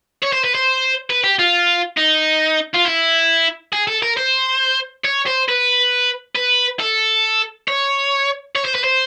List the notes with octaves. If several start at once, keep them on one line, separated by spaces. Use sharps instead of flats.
C#5
C5
B4
C5
B4
G4
F4
D#4
F4
E4
G#4
A4
A#4
C5
C#5
C5
B4
B4
A4
C#5
C#5
C5
B4
C5